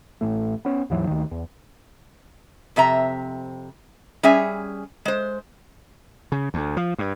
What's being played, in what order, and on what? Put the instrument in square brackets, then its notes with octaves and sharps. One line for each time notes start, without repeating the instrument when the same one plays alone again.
[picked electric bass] A1 A2 A3
B3 C#4
D#2 G#2 E3 F#3
D2 D#3
E2
[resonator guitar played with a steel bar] F2 C3 E5 A#5
G3 C#4 G#4 E5 G#5
G#3 C5
[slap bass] C#3
D2
F3
G2